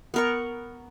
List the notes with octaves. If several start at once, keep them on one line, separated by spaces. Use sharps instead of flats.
B3 A#4 C#6